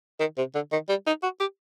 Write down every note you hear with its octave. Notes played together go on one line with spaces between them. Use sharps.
D#3
C3
D3
D#3
G3
D#4
F#4
G4